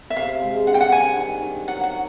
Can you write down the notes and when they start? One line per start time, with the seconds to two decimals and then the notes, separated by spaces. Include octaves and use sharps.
0.10 E5
0.17 C3 F5
0.42 G#3
0.67 D3 F#5
0.74 G5
0.81 F#5
0.92 G3 G#5
1.17 D#3
1.42 D#3
1.67 F#3 F#5
1.84 F#5
1.93 F#3